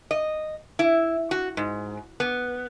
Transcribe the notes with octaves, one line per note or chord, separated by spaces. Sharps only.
D#5
E4
F#4
G#2
B3